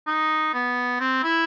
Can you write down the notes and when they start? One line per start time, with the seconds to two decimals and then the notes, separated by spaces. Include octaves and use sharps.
0.07 D#4
0.54 B3
1.00 C4
1.23 E4